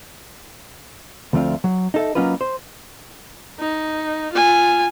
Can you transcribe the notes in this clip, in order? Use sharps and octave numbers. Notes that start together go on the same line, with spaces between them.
D2 F3 A3 C4 F4
F#3
D#4 A4 E5
F#3 A#3 C#4 D#4 F4 B4
C5
D#4
F4 G#5